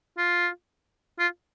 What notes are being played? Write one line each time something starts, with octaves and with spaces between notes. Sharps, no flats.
F4
F4